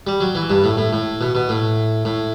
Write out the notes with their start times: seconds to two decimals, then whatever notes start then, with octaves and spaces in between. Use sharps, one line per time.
0.07 G3
0.21 F#3
0.35 E3
0.50 G2
0.64 A2
0.77 A2
0.93 A2
1.21 B2
1.35 B2
1.49 A2
2.05 A2